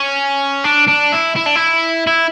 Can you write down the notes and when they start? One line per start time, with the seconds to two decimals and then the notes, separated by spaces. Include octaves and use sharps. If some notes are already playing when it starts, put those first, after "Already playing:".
Already playing: C#4
0.64 D4
0.88 D4
1.12 E4
1.36 E4
1.46 D4
1.55 E4
2.07 E4